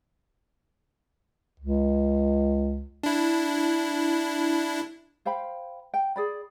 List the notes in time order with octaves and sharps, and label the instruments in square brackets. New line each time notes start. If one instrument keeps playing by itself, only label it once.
[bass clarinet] C#2
[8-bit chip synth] D4 E4
[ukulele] C5 F5 G5 B5
G5
G#4 D5 B5